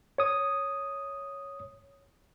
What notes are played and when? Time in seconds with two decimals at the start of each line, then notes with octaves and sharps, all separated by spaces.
0.18 C#5 D#6